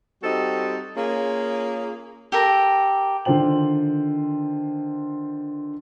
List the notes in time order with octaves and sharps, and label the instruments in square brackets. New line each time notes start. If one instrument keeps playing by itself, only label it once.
[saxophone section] G3 C4 D#4 F#4 A4
A#3 C#4 F4 G#4
[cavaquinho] G4 A4 A#4
[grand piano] D3 D#3 F4 C5 G5 F#7